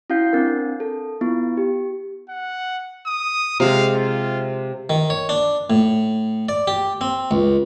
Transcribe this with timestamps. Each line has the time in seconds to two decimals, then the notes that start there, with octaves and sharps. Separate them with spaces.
0.10 C#4 E4 F#4 F5 G6 C7
0.33 C4 D4 A#4
0.80 A4
1.21 B3 E4 F4
1.57 G4
2.29 F#5
3.06 D#6
3.60 C3 G#3 F5
3.94 F4
4.90 D#3
5.10 C#5
5.29 D4
5.70 A2
6.49 D5
6.67 G4
7.01 C4
7.31 C#2